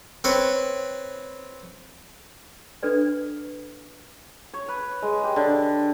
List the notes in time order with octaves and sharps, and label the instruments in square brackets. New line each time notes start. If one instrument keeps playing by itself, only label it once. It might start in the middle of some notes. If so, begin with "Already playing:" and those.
[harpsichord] C4 B4 C#5
[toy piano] D4 A4 B4 D5
[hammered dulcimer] C#5
B4
G#3
G4
D3